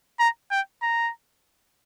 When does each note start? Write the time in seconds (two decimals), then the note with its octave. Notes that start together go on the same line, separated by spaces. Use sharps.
0.19 A#5
0.51 G5
0.82 A#5